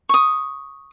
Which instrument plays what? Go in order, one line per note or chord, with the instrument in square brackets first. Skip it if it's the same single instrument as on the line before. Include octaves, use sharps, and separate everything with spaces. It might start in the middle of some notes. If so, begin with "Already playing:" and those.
[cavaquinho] C#6 D#6